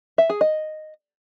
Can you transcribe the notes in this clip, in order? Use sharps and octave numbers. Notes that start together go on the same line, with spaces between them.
E5
G#4
D#5